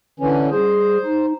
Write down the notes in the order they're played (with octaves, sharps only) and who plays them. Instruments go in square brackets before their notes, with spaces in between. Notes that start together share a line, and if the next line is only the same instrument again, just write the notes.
[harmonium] D3 E3 C#4
[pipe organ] G3 G#4 [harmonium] C5
[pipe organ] D#4